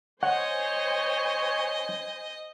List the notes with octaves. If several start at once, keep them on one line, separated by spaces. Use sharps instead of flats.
C5 C#5 D#5 F#5 G#5